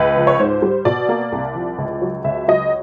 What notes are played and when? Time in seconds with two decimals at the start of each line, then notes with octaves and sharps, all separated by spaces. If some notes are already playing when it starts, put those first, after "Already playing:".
Already playing: C#2 B4
0.16 F3
0.27 C#5
0.39 G#2 C5
0.62 G3
0.85 B2 D5
1.09 A#3
1.32 C2
1.55 F3
1.78 C#2
2.02 F#3
2.24 C#2 E5
2.48 F#3 D#5